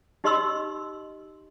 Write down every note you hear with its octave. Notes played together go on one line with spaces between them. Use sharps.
D#4 G4 D#5 B5 C6 E6